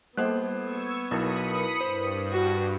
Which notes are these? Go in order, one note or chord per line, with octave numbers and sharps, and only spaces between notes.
G3 A#3 B3 A4 C5 F#6
C#6 E6 G#6
B1 E4 A#4 B4 B5 D#6 C#7
G2 C5
F#4